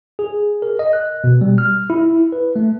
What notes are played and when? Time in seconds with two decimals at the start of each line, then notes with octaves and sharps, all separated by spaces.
0.19 G#4
0.62 A#4
0.79 D#5
0.93 F#6
1.24 B2
1.41 G3
1.58 F6
1.90 E4
2.32 B4
2.56 A3